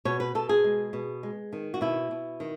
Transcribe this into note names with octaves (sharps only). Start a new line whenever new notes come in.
B2 C#5
B4
B2 A4
G#4
G#3
B2
G#3
D#3
F#4
B2 E4
B2
D#3